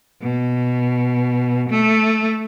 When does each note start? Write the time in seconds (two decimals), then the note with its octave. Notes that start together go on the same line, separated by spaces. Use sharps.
0.22 B2
1.70 A3